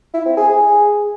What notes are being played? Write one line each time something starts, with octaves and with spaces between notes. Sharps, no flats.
E4
C4
G#4
G#4